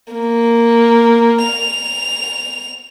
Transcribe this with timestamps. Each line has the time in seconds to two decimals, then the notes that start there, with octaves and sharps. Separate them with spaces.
0.14 A#3
1.44 F7